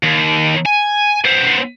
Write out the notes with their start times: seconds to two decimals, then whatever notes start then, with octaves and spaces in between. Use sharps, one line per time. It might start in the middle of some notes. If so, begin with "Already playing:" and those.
0.03 D#2
0.66 G#5
1.25 B3 C5